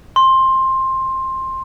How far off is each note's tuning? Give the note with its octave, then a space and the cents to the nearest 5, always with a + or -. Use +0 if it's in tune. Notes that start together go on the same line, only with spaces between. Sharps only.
C6 +15